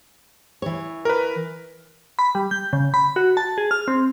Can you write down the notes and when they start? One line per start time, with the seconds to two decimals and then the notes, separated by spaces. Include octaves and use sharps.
0.62 E3 C#5
1.05 A#4 B4
2.19 B5
2.35 G3
2.51 G6
2.73 C#3
2.94 B5
3.16 F#4
3.37 A5
3.58 G#4
3.71 F6
3.88 C4